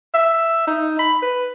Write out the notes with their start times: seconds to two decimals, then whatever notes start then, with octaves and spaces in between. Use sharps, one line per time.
0.14 E5
0.67 D#4
0.99 B5
1.23 B4